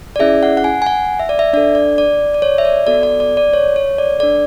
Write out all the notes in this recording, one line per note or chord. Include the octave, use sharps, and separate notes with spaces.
D5
C#4 E4 G#4 E5
F#5
F#5
G#5
G#5
F#5
E5
D5
E5
D4 A4 D5
D5
D5
D5
C#5
E5
D5
B3 F#4 A4 D5
D5
D5
D5
C#5
C#5
D5
D4 A4 D5